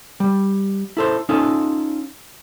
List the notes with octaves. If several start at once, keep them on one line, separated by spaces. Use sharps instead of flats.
G3
E4 A4 C5
C#4 D#4 F4 A4